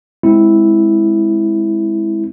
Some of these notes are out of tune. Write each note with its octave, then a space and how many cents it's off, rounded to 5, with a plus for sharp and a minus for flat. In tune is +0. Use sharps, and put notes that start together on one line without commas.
G#3 +0 C4 +0 E4 -5